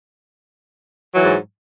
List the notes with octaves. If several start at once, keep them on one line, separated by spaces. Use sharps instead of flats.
G#2 E3 F#3